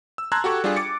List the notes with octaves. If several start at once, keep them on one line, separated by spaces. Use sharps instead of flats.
E6
A5 A#5 C6 E6 F#6 G#6
F#4 G4 A4 C#6
G3 D4 F4 G4 G#4
D6 A6 C#7